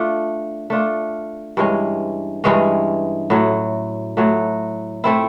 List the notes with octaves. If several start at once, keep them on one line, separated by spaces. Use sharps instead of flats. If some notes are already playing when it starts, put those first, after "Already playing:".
Already playing: A3 D4 F4
A3 D4 F4
G2 E3 G#3 C#4
G2 E3 G#3 C#4
A2 F#3 A3
A2 F#3 A3
A3 C4 E4